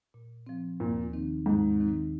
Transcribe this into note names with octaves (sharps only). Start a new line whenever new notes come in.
A#2
F3 C4
D#2 A#2
D#3 C4 D#4
D#2 G#2
D#3 C4 D#4